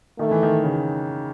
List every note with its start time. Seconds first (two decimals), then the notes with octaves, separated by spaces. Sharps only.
0.19 D#3 A3
0.31 E3
0.43 D#3
0.64 C#3